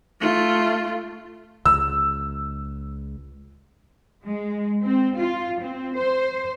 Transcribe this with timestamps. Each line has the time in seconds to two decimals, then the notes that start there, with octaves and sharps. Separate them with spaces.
0.21 A3 F4
1.66 C#2 E6
4.23 G#3
4.83 C4
5.18 F4
5.60 C4
5.95 C5